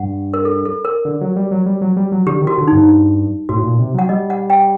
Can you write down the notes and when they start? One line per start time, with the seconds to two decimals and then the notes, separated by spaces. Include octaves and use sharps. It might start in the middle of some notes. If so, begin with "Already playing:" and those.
Already playing: G2 F#5
0.34 A#4
0.45 A4
0.65 A4
0.85 A#4
1.05 D3
1.21 F#3
1.36 G3
1.51 F#3
1.66 G3
1.81 F#3
1.97 G3
2.12 F#3
2.27 D3 G4
2.42 D#3
2.47 F#4
2.58 D3
2.68 G2 D#4
3.49 A2 F#4
3.64 A#2
3.79 C3
3.94 F#3 F#5
4.09 G3 D#5
4.30 F#5
4.50 G5